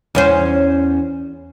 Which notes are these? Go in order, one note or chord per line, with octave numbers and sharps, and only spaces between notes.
E2 C#4 C5